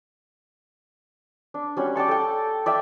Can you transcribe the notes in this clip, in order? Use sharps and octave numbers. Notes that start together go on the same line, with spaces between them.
D4
G3 C#4 F#4
D5 G5 A5 C#6
A4 G5
D5 E5 G5